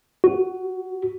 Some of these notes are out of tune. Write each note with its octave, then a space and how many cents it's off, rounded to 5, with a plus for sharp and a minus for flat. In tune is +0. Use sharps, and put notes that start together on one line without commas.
F#4 +15